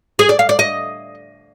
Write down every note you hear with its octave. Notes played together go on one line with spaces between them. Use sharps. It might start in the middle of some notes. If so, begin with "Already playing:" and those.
G#4
D5
F5
D5
D#5